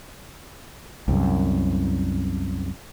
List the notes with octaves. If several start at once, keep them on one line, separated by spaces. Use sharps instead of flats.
C2 F#2